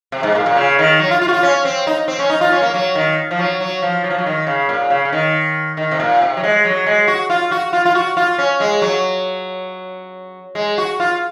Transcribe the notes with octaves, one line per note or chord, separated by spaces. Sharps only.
C3
G#2
A#2
A#2
C#3
D#3
F#3
F4
F4
F#4
F4
C#4
C4
D#4
C4
C#4
D#4
F4
C#4
A#3
F#3
D#3
F3
F#3
F#3
F3
F#3
F3
F#3
D#3
C#3
A#2
C#3
C#3
D#3
D#3
C3
A#2
C3
F#3
G#3
F#3
G#3
F#4
F4
F#4
F4
F4
F#4
F4
C#4
G#3
F#3
G#3
F#4
F4